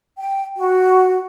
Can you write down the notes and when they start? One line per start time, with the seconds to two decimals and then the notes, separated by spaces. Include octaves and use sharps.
0.17 G5
0.57 F#4